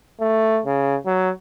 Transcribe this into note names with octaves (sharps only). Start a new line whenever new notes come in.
A3
C#3
F#3